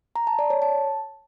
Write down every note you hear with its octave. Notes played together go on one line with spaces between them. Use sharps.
A#5
A5
D5
C#5
A5